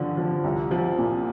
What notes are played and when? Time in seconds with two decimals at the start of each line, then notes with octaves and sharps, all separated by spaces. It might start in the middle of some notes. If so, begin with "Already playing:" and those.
Already playing: G2 D3 F3
0.17 F3
0.44 C2
0.71 F3
0.98 A#2